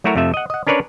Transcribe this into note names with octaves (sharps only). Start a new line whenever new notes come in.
F#3 A3 E4 F#4 A#4 C#5
F2 C3 A3 E5
D#5 F#5
D#5 F#5
C#4 D4 A#4 B4 C#5 D5